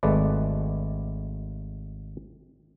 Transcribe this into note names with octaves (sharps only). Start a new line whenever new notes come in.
G#1 G#3 A3 B4 D5